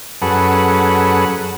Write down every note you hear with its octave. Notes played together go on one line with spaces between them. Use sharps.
F#2 G#4 A4 B4 F#5